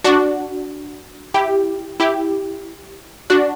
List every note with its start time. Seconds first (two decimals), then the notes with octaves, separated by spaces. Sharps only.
0.04 D4 F#4
1.34 E4 G4
2.00 E4 G4
3.30 D4 F#4